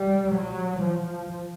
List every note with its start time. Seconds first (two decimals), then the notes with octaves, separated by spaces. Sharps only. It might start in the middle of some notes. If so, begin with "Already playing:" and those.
Already playing: G3
0.35 F#3
0.83 F3